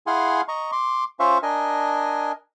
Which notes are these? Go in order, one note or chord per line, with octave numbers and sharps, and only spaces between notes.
E4 G#4 F5 F#5 G#5 C6
D#5 A#5 C#6
C6 D6
C#4 F4 C5 E5 F5 C#6
D4 A#4 D#5 G#5